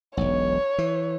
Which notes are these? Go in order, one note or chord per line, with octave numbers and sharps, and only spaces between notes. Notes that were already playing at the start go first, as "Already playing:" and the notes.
E1 B1 C#5
E3